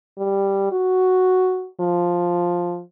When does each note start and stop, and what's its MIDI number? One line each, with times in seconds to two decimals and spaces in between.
0.18 0.68 55
0.72 1.68 66
1.80 2.81 53